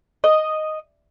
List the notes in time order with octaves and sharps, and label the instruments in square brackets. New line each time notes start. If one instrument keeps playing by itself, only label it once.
[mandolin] D#5